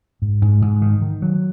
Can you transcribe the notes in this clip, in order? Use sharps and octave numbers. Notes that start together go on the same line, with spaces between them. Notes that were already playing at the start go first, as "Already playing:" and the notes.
G#2
G#2
G#2
D#3
D#3
F#3